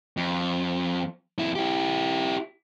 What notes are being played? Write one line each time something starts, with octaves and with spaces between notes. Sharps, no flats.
F2
F2 E4
E4 G4